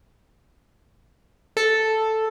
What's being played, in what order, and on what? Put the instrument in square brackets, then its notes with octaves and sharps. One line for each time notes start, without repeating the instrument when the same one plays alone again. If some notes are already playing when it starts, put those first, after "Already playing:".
[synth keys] A4